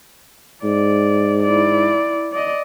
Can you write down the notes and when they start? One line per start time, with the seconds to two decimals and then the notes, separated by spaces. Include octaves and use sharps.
0.64 G#2 D5
1.44 E4 D5
2.32 D5 D#5